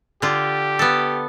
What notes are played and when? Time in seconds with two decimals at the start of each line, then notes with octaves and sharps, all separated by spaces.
0.22 D3 F4 G4
0.79 B3 A4